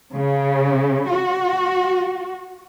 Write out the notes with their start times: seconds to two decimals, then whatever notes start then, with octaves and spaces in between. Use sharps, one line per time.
0.14 C#3
1.13 F#4